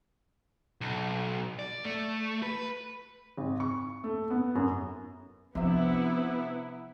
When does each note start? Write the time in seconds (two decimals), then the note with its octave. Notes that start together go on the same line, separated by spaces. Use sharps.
0.81 B1
1.59 D5
1.85 A3
2.43 B4
3.37 G#1
3.60 C#6
4.04 A3
4.30 B3
4.55 F#2
5.55 C3 F3 B3 D4 E4 E5